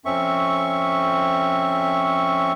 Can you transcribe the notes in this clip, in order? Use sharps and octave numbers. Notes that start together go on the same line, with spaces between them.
F2 C4 C#4 E5 C#6